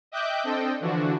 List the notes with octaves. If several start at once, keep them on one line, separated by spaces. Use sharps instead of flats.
D#5 E5 G5 D6 F#6 G6
C4 D4 A4 D#5 G5
D3 E3 F3 D4 F#4